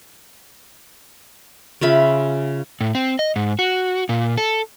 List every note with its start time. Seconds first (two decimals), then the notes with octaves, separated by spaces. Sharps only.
1.81 C#3 F4 E5 B5
2.81 A2
2.95 C4
3.19 D#5
3.36 G#2
3.59 F#4
4.09 A#2
4.37 A4